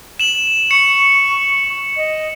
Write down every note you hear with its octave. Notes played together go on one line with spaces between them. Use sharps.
E7 F#7
C#6 C#7
D#5